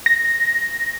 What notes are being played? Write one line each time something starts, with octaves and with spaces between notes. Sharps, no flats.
A#6